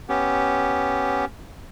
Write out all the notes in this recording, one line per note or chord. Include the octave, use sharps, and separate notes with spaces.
B3 C#4 G4